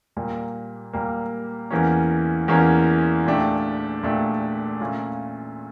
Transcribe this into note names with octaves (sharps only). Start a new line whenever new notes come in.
A#2 G3 A#3
A#2 G3 A#3
E2 E3 A#3 C#4
E2 E3 A#3 C#4
A#2 A3 D4 G4
A#2 A3 D4 G4
A#2 A3 C#4 F4